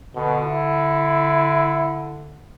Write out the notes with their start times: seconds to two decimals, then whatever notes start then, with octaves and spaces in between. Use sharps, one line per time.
0.15 B2 D3
0.45 E4